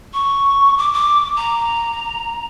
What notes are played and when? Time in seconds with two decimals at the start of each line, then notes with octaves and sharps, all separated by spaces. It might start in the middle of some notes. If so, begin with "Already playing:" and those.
0.13 C#6
0.78 D6
0.93 D6
1.36 A#5